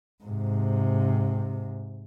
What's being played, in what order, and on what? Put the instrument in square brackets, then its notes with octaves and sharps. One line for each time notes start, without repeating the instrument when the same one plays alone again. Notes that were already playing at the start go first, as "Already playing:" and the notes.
[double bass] G#2 C3